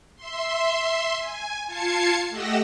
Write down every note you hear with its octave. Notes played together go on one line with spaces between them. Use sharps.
E5 C6
G#5
F4 A5 G#6 C7 C#7
A3 G4 D#5 F#5 E6 A#6